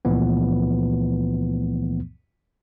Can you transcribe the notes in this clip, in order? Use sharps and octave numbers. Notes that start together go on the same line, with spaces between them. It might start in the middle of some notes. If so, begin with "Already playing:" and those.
C#2 A#2 E3 F3 A3 B3